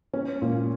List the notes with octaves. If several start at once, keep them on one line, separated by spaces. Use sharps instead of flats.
C#4
A#2